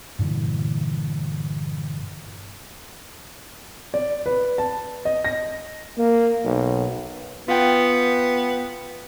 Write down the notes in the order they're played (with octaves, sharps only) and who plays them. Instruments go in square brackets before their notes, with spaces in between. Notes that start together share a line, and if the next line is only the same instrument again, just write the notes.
[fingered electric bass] G2 A#2 D3 E3
[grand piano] D5
B4
A5
D#5
A#6
[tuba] A#3
B1
[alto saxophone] B3 [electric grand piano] F4 F#5 G5